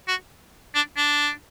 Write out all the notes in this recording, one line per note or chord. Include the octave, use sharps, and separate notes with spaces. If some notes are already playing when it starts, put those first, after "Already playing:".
F#4
D4
D4